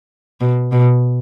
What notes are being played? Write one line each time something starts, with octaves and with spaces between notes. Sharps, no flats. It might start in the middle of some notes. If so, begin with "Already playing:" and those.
B2
B2